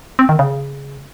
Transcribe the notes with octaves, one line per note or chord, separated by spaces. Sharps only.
C4
D#3
C#3